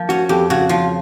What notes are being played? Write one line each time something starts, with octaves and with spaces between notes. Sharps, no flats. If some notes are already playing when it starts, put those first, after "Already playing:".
Already playing: F3 A#3
C#4 F#4
F2 G4
C#3 F#4
F3 F4